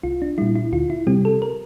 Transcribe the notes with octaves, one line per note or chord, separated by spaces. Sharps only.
C2 F4
D4
A#2 G3 E4
E4
D2 F4
E4
C3 G3 C4 G4
A4
A#4